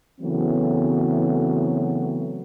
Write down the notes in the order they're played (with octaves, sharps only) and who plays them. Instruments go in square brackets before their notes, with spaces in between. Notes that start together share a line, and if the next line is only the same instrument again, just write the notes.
[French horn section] C#3 E3 F#3 A3 B3 C4